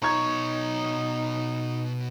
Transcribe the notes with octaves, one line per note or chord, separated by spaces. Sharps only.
B2 D#4 C#5 A#5 C#6 G#6